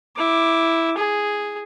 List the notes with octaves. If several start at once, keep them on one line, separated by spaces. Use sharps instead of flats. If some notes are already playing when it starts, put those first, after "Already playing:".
E4 D6
G#4